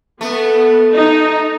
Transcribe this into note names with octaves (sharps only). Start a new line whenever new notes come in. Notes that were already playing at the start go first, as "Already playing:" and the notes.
A3 B3
D#4